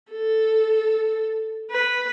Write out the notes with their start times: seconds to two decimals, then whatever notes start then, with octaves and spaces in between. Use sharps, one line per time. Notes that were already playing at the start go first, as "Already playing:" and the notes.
0.11 A4
1.71 B4